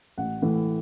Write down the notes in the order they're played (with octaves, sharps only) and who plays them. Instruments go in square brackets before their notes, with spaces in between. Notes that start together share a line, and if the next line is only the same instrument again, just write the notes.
[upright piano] A1 F#5
A2 E3